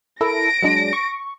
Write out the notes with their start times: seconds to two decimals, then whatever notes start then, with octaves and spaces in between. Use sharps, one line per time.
0.21 E4 A4 A#4 A#6 D7
0.62 F#3 G#3 D4
0.93 C#6